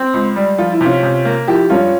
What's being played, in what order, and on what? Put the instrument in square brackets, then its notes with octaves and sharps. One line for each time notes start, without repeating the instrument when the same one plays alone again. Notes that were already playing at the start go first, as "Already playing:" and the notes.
Already playing: [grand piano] C4
C#2
G3
[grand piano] F3 [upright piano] F4
[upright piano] E4
[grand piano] C3 [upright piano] C#4 F4
[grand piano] C3
A#3
[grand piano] F3 [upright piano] E4 G4
[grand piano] G2 [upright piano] C#4 F4